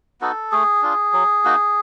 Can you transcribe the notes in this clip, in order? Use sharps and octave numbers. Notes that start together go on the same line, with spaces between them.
B3 D#4 F#4 A4
A3 G#4
D4 F4
F#3
A#3 D#4 F#4